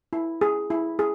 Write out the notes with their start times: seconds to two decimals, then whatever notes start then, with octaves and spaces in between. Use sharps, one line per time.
0.13 E4
0.41 G#4
0.70 E4
0.99 G#4